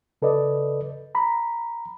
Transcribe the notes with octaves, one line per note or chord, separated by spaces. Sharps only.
C#3 A4 B4 D5 D#5
A#5 B5